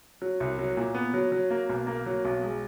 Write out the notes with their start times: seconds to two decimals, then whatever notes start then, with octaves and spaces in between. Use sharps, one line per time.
0.22 F#3
0.40 C2
0.59 F#3
0.77 A#2
0.95 B3
1.14 F#3
1.32 F#3
1.51 A#3
1.70 B1
1.87 A#3
2.06 F#3
2.25 B1
2.43 G#3